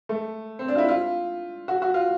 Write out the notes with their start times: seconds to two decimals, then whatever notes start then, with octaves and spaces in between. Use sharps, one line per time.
0.09 A3
0.59 C4
0.68 D4
0.75 F4
0.78 E4
0.89 F4
1.68 F#4
1.82 F#4
1.94 F4